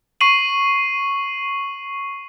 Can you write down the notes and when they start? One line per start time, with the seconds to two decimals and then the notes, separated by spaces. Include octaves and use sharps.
0.21 C#6 C7 D#7 F#7